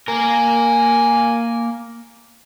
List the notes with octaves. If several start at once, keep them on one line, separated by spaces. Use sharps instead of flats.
A#3 A#4 G#5